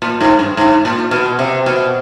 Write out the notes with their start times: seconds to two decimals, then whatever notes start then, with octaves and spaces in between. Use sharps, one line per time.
0.02 A#2
0.21 G#2
0.39 G2
0.57 G#2
0.85 A#2
1.11 B2
1.39 C3
1.66 B2